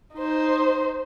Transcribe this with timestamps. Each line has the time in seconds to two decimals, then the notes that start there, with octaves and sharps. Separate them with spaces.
0.14 D#4 C5